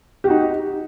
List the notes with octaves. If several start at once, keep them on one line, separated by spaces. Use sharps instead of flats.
D#4 F#4 G4